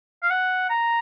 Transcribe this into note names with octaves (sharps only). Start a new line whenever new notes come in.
F5
F#5
A#5